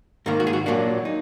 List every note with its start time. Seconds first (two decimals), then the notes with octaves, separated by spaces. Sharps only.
0.26 G#2 D#3 A#3 A#4
0.40 F#4
0.47 G#4
0.53 F#4
0.66 A#2 F#3 A#3 D4 F#4
1.05 D#4